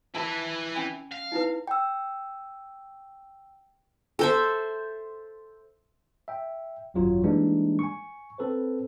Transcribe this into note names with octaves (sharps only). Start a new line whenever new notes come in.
E4 A#4 B4 E5 A5
C#4 G#5 B5
F5
D#4 E4 B4
G5 E6
A4 C5 E5
E5 G5
G#1 F#2 F#3 F4 C#5
E3 G3 G#3 A#3 D4 D#4
G#5 C#6
C4 A4 B4 C5